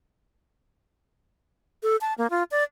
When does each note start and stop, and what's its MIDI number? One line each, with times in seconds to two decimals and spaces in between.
1.83 1.97 69
2.01 2.14 81
2.18 2.27 58
2.30 2.43 65
2.51 2.63 74